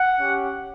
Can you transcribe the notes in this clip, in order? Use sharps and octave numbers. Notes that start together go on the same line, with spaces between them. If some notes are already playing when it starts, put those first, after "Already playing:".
Already playing: F#5
C#4 G4